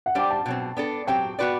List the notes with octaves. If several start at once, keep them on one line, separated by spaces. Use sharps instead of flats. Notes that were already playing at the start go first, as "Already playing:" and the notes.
F#5
G3 D4 G4 C5 G5
A5
B2 F#3 C4
B3 D4 A4
F#3 C4 G4 G5
B3 F#4 B4 D5